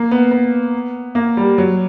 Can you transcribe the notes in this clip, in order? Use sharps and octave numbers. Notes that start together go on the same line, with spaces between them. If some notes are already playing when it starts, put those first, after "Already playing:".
Already playing: A#3
B3
B3
A#3
G3
F#3